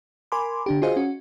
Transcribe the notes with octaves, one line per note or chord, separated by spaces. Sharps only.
A#4 G#5 B5 C6 D6
D3 D4 G4
F4 F#4 G#4 C5 D#5 F5
C#4 F#4